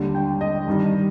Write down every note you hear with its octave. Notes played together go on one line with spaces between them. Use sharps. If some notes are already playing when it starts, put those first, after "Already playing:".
Already playing: D#2 D3 G3 D4
G5
D#5
G2 D#3 G3